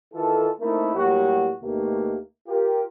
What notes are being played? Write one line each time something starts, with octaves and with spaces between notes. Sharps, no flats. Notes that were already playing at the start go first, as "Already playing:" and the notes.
D#3 E3 F4 A4
A3 A#3 C4 D#4 E4 A#4
A2 F#3 G3 A#3 F#4 G4
D2 B2 A3 A#3 D#4 G4
F4 G4 A#4